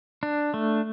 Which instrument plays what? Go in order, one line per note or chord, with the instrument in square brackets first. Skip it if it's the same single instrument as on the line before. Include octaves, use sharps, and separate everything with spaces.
[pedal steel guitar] D4
A3